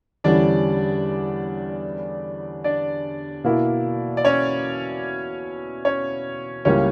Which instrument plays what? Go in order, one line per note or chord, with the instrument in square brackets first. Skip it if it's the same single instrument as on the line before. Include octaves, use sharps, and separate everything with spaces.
[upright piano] E2 D3 G3 C#4 E4 [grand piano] D4 D5
[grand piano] D4 D5
[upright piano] B2 A#3 E4
[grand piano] D5
C#4 C#5
C#4 C#5
[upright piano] C#2 C#3 G3 A#3 E4 [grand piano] C#4 C#5